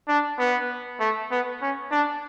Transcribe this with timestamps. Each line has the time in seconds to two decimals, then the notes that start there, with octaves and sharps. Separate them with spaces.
0.08 D4
0.39 B3
1.00 A3
1.31 B3
1.62 C#4
1.91 D4